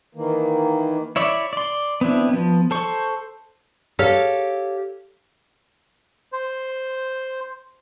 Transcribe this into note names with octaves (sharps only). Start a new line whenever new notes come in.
D#3 E3 A#3
E4 C#5 D5 E5
D5 C6
B3 C4 D4 E4
F3 B3
A4 C5 C#6
G4 A4 C#5 F5
C5